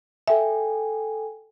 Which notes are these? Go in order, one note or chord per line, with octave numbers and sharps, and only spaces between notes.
A4 E5 G5 G#5